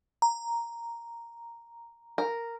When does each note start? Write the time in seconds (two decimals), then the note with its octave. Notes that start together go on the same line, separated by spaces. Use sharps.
0.22 A#5
2.18 A#4